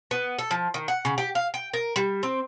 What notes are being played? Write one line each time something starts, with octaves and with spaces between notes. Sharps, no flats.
B3
A4
F3
D#3
F#5
C#3
G4
F5
G5
A#4
G3
C4